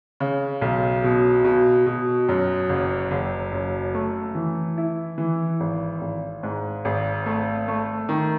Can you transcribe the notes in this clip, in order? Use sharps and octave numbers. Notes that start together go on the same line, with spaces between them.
C#3
B1
B2
B2
B2
F#2
F#1
F#1
F#2
A3
E3
E4
E3
G#1
G#1
G#2
G#1
A3
A3
D#3